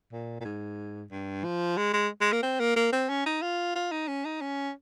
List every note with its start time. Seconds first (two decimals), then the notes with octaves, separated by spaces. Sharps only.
0.12 A#2
0.40 A#2
0.45 G#2
1.11 G2
1.44 F3
1.77 G#3
1.93 G#3
2.21 G#3
2.32 A#3
2.43 C4
2.60 A#3
2.76 A#3
2.92 C4
3.09 C#4
3.26 D#4
3.42 F4
3.75 F4
3.92 D#4
4.08 C#4
4.25 D#4
4.41 C#4